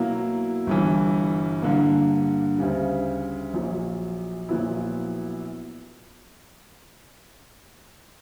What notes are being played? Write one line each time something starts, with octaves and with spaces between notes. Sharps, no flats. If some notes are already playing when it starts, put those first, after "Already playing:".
Already playing: B2 F#3 A#3 E4
G1 G2 E3
G2 D3 A#3
D2 C#3 G3
A#1 A#2 F#3
A#1 A#2 F#3 B3 E4